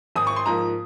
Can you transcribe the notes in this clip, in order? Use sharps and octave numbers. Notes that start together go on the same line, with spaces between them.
G#1 D#6
C#6
C6
G#2 F3 A#3 A#5